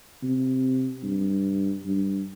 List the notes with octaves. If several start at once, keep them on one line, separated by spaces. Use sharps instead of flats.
C3
G2
G2